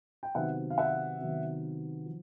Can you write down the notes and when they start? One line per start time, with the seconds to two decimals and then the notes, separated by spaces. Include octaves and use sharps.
0.23 G5
0.35 C3 D#3 F#3 B3 D#4 E5 F#5
0.70 F5
0.78 E5 F#5
1.20 C3 D#3 F#3 B3 D#4
2.06 F3